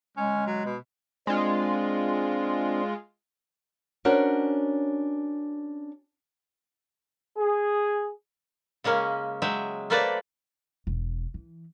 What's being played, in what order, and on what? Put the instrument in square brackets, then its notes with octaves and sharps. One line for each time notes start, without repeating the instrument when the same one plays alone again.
[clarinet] G#3 [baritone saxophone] C#4
[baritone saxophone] F#3
B2
[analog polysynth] G#3 F4 [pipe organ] C4 D4
[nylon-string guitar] C#4 D4 F#4 A#4 C5 C#5
[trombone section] G#4
[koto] C#3 G#3 A#3 C#4
F#3 G#3 E5 G5
A3 A#3 A4 B4 C5 D5
[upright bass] E1
E3